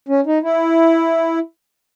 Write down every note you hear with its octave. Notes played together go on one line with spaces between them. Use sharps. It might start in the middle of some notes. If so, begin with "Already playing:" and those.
C#4
D#4
E4